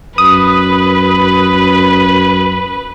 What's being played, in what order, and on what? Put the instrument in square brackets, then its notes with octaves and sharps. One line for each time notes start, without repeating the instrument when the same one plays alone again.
[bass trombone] F#2 [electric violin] B4 [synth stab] D#6